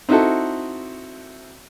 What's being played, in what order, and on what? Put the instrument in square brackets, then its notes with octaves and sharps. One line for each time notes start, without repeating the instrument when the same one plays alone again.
[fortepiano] C4 D#4 E4 F#4 A4